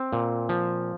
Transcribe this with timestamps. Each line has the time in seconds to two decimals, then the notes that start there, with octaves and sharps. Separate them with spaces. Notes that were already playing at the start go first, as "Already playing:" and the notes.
Already playing: C4
0.13 A#2
0.49 F3